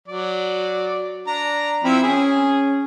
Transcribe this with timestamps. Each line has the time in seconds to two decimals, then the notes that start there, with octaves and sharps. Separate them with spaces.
0.08 F#3 D5
1.27 D4 A#5
1.84 F3 C4 E4 B5
2.03 C#4 G#4